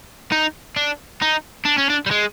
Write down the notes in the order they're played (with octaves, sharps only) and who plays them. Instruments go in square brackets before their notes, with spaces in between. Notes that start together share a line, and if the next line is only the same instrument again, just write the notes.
[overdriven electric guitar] D#4
D4
D#4
D4
C#4
D4
G3
G#3